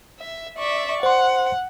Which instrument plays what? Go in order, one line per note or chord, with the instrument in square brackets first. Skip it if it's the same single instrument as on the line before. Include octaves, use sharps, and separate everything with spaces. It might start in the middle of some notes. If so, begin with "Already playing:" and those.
[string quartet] E5
D5 E5 C#6
[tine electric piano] C5 C6 [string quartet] F#5